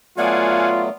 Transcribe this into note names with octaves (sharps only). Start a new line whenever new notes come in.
F#3 A3 B3 F4 D5 F5 F#5 G#5